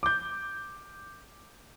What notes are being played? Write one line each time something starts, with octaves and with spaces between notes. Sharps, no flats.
D6 G6